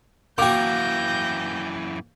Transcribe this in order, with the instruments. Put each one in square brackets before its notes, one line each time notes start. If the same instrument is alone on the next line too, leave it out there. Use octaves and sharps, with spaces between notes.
[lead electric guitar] F#2 E3 [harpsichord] A#3 F#4 [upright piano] G5 D6 [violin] G6 A#6